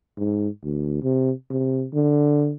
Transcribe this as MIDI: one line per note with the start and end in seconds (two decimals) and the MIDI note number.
0.18 0.48 44
0.63 1.02 38
1.03 1.31 48
1.51 1.86 48
1.93 2.54 50